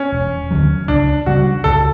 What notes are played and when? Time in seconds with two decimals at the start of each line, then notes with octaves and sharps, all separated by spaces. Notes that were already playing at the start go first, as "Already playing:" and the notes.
Already playing: C#4
0.12 E1
0.51 D2 D3 F#3
0.88 C#2 D4
1.26 C#3 G3 F#4
1.64 C#2 A4